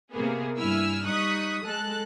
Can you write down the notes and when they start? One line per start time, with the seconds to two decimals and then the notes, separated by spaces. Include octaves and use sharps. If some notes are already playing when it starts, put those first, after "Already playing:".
0.12 C3 A#3 B3 G#4
0.58 G2 G3 E4 G#5 E6 F6
1.05 G3 D#4 C#6 D#6 F#6 B6
1.64 G#3 A4 A5 F#6